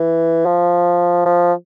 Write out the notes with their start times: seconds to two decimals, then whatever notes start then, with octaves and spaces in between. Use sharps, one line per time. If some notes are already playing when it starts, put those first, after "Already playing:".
Already playing: E3
0.46 F3
1.25 F3